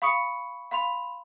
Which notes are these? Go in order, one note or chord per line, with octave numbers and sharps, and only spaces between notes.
F5 B5 C#6 D#6 C#7
F5 B5 C6 F7